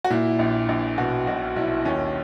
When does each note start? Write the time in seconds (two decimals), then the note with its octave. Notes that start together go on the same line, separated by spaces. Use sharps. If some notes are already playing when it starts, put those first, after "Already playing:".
0.04 F#4
0.10 A#2 E4
0.39 A#1
0.69 A#1
0.98 B2 F#4
1.27 B1 F#4
1.56 B1 E4
1.85 D#2 C#4